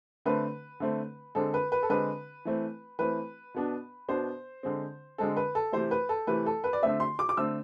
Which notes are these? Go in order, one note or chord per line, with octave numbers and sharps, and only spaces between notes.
D3 A3 C4 B4
D3 A3 C4
D3 G#3 C4 A4
B4
B4
A4
D3 G#3 C4 B4
E3 A3 C4
E3 A3 C4 B4
B2 B3 D4
B2 B3 D4 C5
D3 G#3 C4
D3 G#3 C4 A4
B4
A4
C3 E3 A3 C5
B4
A4
C3 E3 A3 B4
A4
B4
D5
D3 A3 C4 E5
C6
D6
D6
D3 A3 C4 E6